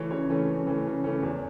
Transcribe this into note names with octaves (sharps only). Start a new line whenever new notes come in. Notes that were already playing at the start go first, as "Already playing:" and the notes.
Already playing: C#3 E3 A3 C#4 C#5
C#3 C#5
E3 A3 C#4
C#3
E3 A3 C#4
C#3
E3 A3 C#4
E2